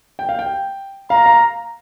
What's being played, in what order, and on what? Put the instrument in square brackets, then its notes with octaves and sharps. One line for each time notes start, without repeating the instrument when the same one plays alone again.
[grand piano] G5
F5
G5
[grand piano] F5 [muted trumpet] A#5
[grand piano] F5